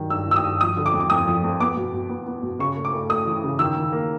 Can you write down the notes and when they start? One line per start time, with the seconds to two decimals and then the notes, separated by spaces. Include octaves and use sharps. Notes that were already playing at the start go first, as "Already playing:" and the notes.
Already playing: G2 D#3 F#3
0.10 G2 E6
0.27 D#3 E6
0.36 D#6
0.44 G2
0.61 F3 D#6
0.77 D3
0.86 D6
0.93 F2
1.00 D6
1.10 F2 D#6
1.27 F3
1.44 F2
1.60 B3 D6
1.77 B2
1.93 B2
2.09 B3
2.26 B3
2.43 B2
2.59 C#3 C#6
2.76 A3
2.85 D6
2.93 A3
3.09 A3 D#6
3.26 E3
3.43 C#3
3.59 D#3 E6
3.77 D#3
3.92 A#3